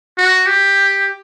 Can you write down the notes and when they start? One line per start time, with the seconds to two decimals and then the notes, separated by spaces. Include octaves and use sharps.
0.18 F#4
0.47 G4